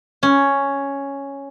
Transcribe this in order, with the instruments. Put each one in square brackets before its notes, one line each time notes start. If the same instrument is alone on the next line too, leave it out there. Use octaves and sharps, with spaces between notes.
[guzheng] C#4